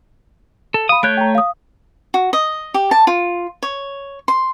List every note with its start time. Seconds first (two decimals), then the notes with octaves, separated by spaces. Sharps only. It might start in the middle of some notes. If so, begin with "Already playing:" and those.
0.74 A4
0.89 F5 B5 D#6
1.03 A3 C#5 F#6 G6 D7
1.17 G5 A#5
1.35 F5 D#6
2.14 F#4
2.33 D#5
2.74 G4
2.91 A5
3.07 F4
3.63 C#5
4.28 C6